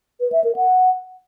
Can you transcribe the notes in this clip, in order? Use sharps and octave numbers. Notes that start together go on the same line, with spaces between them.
B4
E5
A#4
F#5